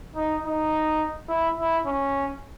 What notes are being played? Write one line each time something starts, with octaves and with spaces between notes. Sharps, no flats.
D#4
D#4
E4
E4
C#4